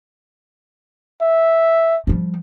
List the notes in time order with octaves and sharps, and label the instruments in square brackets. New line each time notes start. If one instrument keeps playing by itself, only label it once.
[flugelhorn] E5
[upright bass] F3 G3